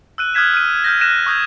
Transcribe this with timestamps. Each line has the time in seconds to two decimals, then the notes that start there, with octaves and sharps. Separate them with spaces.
0.18 E6 F#6 D#7
0.34 D#6 F6 F#6 G#6 B6 E7
0.54 F6 D#7
0.84 F6 G6 A#6
1.01 F6 F#6 A#6 D#7 E7
1.26 C#6 D#6 G6 G#6